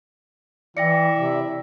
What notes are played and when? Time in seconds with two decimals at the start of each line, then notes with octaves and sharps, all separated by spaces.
0.77 E3 E4 D5 E5 G5 A#6 C#7
1.17 C3